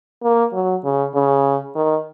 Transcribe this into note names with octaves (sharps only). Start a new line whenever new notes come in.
A#3
F#3
C#3
C#3
D#3